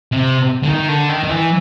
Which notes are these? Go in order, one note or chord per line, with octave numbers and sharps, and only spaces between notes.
C3
D3
D#3
D3
D#3
D#3
E3